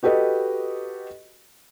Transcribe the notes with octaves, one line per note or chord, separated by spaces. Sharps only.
F#4 G4 A4 B4 D#5